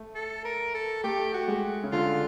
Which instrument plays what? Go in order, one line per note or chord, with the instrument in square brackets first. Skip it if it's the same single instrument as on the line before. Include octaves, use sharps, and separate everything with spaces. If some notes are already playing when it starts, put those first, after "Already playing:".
Already playing: [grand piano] A3
[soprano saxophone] A4
A#4
A4
[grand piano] A3 [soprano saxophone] G4
[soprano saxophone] F#4
[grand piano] G#3
C#3
[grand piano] D3 [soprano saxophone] F4